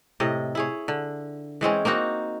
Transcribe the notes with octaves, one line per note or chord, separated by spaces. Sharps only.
A2 C3 D#5
E4 G#4 C#5
D3
E3 G#3 C4 C#4
A#3 C4 D#4 F#4